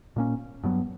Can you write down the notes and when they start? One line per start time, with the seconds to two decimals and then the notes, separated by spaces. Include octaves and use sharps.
0.16 A#2 A#3 C#4
0.64 G2 F#3 B3